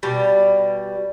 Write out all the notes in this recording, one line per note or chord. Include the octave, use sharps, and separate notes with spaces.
B2 G3